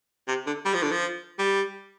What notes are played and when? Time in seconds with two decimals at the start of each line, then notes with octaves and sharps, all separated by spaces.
0.28 C3
0.47 D3
0.65 G3
0.74 F3
0.83 D3
0.92 F3
1.39 G3